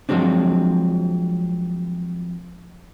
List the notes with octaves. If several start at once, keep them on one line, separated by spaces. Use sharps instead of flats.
F3 F#3 G#3 C4 D4